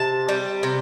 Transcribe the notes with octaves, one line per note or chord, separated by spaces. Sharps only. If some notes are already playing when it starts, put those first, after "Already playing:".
Already playing: C3 A5
G3
C3